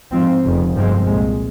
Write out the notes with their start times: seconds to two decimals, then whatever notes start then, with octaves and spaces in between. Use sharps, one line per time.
0.12 G#2 F3 C4
0.43 F1 F2 C#3
0.74 G1 G2 F3 G#3 C4
1.06 C2 A#2 G#3